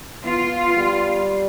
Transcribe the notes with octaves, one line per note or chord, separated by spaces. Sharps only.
B3 F4
G3